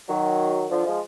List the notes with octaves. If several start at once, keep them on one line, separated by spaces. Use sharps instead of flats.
D#3 F#3
D3 F3
F3 G#3